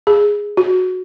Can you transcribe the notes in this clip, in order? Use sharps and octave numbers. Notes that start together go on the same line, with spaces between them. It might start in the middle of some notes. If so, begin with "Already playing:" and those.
G#4
F#4